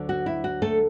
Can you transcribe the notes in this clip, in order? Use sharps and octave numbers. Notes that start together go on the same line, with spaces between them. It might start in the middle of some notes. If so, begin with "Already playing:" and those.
Already playing: D2 D3 F#3
F#4
E4
F#4
A3 A4